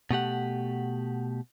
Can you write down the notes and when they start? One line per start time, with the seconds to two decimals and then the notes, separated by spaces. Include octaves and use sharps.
0.11 B2 A3 G4 F#5